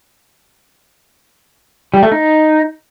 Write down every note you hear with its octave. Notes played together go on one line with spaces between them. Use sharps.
G3
A3
D#4